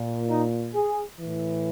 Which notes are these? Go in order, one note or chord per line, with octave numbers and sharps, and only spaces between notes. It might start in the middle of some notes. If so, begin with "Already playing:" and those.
Already playing: A#2
D#4
G#4
A2 E3